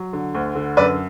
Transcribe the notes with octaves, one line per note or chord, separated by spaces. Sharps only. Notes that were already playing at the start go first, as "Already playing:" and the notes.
Already playing: F#3
D3
D2
D3
F#2 B4 D5